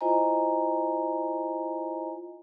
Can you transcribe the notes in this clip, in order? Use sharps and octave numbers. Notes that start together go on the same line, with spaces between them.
E4 F4 C5 D#5 G#5 A#5